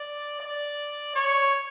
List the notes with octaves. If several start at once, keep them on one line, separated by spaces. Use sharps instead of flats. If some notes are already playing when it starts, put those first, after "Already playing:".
Already playing: D5
D5
C#5